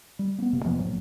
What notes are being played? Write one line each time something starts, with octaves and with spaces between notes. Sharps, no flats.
G3
A#3 B3
F#1 C3 A#3
F2 E3 F3 B3
A#1 A2 F#3 A#3